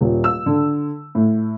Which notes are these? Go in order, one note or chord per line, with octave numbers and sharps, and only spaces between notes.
D#1
E6
D3
A2